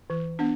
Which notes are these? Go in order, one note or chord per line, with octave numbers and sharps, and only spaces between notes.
E3
B3 D4